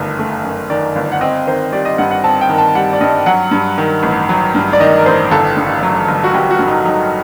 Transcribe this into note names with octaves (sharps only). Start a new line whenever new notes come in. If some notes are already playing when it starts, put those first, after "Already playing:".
Already playing: G1 F#2 D#3 A3
A3
F#2
D#3 D5
G1
F#5
C4 D#5
D#3 C5
G3 D5
D#5
G2 F#5
F#5
C4 A5
G5
D#3
A5
G3 F#5
D5
G2 D#5
F#3 F#5
G2
D#3
A1
F#3
G2
D5
D#3 D#5
A#4
A1 C5
G1 A4
G2
F#3
G1
F#4
G1 G4
F#4
G2
D#4
F#3 D#4